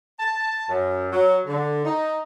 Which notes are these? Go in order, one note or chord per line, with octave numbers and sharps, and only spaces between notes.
A5
F#2
F#3
D3
D#4